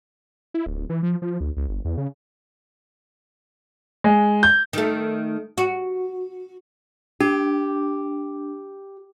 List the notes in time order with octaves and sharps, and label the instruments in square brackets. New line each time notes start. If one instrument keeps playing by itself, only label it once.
[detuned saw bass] E4
D1
E3
F3
F3
D2
C#2
G1
E2
C#3
[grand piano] G#3
G6
[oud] D#3 A3
F#4
[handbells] D4 [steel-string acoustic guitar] G4